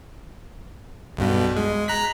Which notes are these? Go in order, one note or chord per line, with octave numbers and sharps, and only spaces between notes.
B1 G2 B2
G#3
A#5 F#6 B6